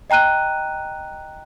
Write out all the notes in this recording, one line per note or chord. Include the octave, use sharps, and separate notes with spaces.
D#5 G5 A#5 F#6 D#7